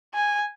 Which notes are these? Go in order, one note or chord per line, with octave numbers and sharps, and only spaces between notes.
G#5